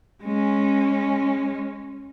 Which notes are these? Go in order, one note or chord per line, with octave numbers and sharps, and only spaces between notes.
G#3 C#4